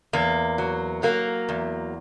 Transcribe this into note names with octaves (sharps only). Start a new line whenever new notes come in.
E2 A#3
F#3
F#3 A#3
E2